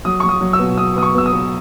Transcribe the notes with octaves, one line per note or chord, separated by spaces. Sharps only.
F#3 D#6
F#3 C#6
D#6
F#3
E6
B2
B2 D#6
B3 D#6
C#6
B2 E6
D#6
B3